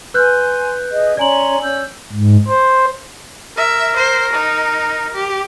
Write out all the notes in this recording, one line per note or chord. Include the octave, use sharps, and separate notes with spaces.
B4 G#5 C6 F#6 G6
G#4 D#5 E5
C#4 D5 G#5 A#5 C6 F#7
C#4 E6 G6
G#2
C5
A#4 E5
C5
D#4
G4